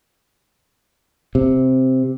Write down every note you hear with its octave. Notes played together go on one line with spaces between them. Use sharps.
C3